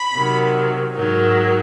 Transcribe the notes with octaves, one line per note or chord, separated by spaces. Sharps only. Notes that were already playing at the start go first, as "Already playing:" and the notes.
Already playing: B5
C3 D#3 F#3
G#2 D#3 F#3